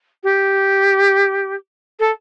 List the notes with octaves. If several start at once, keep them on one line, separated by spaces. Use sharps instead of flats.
G4
A4